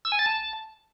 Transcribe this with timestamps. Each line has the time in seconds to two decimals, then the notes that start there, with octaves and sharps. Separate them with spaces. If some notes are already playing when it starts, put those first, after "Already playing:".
0.05 E6
0.12 G#5
0.19 A6
0.26 A5